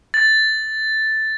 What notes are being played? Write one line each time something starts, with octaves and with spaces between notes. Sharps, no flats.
A6